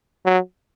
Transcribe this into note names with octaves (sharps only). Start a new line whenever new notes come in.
F#3